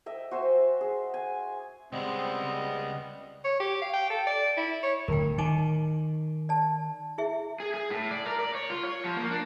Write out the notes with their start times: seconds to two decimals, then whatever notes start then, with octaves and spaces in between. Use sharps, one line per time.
0.06 D#5 E5 G5
0.31 F#4 C5 E5 G#5
0.81 G#4
1.14 G#5
1.93 C#2 G3 G#3 B3 C4 D#5
3.44 C#5
3.60 G4
3.82 F5
3.93 G5
4.10 A4
4.27 D5
4.57 E4
4.83 C#5
5.08 D1 A#4 G5
5.38 D#3 D#4 G#5 D6
6.49 D5 A5
7.18 E4 G#4 E5
7.60 G#4
7.74 G#4
7.90 A2
8.11 D5
8.26 A#4
8.39 D5
8.55 C#5
8.70 F4
8.83 C#5
9.04 F3
9.16 A#3
9.31 D4